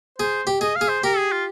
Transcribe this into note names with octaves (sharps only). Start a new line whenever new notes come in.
G#4 C5
G4
G#4 D#5
F5
G#4
C5
G4 A#4
G#4
F4